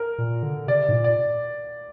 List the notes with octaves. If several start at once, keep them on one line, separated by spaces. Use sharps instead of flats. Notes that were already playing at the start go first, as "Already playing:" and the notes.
Already playing: A#4
A#2
D3
C3 D5
G#2
A#2
D5